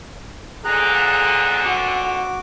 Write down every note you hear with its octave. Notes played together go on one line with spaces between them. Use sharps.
F2 A#2 D3 G#4 A#5 F#6
F#4 D6